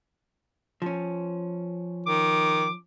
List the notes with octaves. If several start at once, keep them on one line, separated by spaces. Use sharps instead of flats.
F3 C#4
D#3 D6